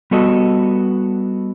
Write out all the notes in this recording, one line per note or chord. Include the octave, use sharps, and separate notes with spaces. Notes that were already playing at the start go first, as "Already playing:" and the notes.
G3 B3 F#4 A4 D#5